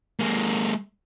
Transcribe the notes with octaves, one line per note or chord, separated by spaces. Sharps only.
G#3 A#3